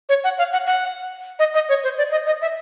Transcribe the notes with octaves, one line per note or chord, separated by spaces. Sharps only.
C#5
F#5
F5
F#5
F#5
D#5
D#5
C#5
C5
D5
D#5
D#5
E5